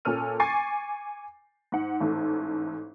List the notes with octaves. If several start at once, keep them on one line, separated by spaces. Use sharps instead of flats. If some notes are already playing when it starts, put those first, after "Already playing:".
A#2 C#4 A4 F6 D#7
G#5 C#6 D6 A6 C7
G#2 F#5
A1 G#2 A4